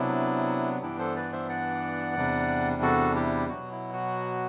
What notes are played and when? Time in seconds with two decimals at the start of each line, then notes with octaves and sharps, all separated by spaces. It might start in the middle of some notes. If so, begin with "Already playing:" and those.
Already playing: C3 F#3 B3 D4 E4
0.82 G2 E3 B3 D4 E4 G4
0.99 A4 C5
1.16 B4 D5
1.32 C5 E5
1.49 D5 F#5
2.16 E2 C3 G3 D4
2.82 F#4 A4
3.16 E4 G4
3.49 B2 F#3 B3 F#4
3.71 E4
3.93 F#4